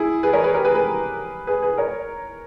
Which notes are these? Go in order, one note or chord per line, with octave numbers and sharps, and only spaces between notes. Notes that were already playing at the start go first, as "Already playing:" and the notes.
Already playing: E4 G#4
G#4 B4
A#4 C#5
G#4 B4
G4 A#4
G#4 B4
G#4 B4
G#4 B4
G#4 B4
A#4 C#5